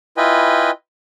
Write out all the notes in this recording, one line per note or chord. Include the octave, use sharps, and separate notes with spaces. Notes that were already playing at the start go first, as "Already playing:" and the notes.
E4 F4 B4 D#5 G5 G#5